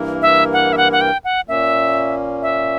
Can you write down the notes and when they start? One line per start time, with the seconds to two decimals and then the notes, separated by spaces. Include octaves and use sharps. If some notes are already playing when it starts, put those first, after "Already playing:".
Already playing: G2 E3 A#3 E4 A#4
0.22 E5
0.53 F#5
0.73 E5
0.77 F#5
0.92 F#5
1.01 G5
1.24 F#5
1.48 A#2 A#3 C#4 E5
2.42 E5